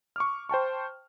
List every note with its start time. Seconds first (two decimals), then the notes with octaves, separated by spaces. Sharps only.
0.16 C#6 D6 F6
0.49 C5 G5 A5 C#6